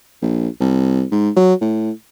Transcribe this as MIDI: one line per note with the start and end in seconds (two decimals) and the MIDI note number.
0.22 0.48 34
0.60 1.04 36
1.11 1.30 44
1.36 1.54 54
1.61 1.91 45